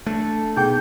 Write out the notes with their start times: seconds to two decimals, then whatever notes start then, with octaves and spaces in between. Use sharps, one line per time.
0.06 A3 D4 A4 E5
0.56 B2 B3 D#4 G#4 G5 G6